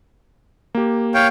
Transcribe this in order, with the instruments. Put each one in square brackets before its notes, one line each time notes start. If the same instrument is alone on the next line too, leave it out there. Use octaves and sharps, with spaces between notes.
[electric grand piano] A#3 G4
[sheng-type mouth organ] C#5 F5 G5